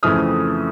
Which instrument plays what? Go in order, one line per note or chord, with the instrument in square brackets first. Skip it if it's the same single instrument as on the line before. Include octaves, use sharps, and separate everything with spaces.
[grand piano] F2 C#3 E3 A3 C4 D#6 F6